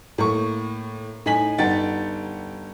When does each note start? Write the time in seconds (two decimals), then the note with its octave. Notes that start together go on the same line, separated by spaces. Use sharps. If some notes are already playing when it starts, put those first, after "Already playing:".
0.18 A2 A#3 C#6
1.26 A2 D#4 D#5 G#5 B6 F#7
1.58 G1 D#4 F#5 G5 A6